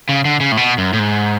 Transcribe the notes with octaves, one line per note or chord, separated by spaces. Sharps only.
C#3
D3
C#3
A2
B2
F#2
A2
G#2